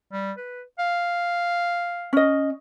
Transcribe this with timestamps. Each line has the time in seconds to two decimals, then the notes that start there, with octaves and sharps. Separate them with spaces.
0.13 G3
0.38 B4
0.79 F5
2.13 C#4 D#5